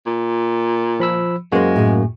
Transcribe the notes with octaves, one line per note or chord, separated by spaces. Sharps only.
A#2
F3 B5 E6
F#2 G#3 A#3 F#4 G#4 C5
A2 G#4